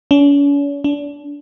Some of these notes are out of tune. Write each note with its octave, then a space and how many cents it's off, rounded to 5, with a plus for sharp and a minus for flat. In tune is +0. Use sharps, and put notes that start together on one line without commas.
C#4 +45
D4 -30